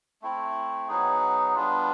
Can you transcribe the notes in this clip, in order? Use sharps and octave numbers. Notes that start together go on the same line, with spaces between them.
A3 C4 E4
F#3 B3 D#4 G#4
G3 B3 D4 F4